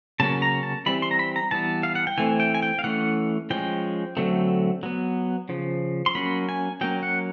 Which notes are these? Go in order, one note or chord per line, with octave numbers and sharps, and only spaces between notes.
C#3 F#3 A#3 C#4 A5
A#5
A5
E3 G3 C4 B5
C6
A#5
B5
A#5
E3 G3 B3 A5
F5
F#5
G5
E3 A3 C4 G#5
G5
G#5
G5
F5
E3 A3 C#4 F#5
F3 G#3 C#4 G5
D3 F#3 A3 C4
F#3 B3
C#3 F3
C6
F#3 A#3 C#4 B5
G#5
F#3 A#3 C#4 G5
F#5